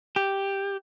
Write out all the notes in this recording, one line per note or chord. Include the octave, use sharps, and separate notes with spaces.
G4